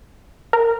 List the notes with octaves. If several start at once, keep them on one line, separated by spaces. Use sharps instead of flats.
A#4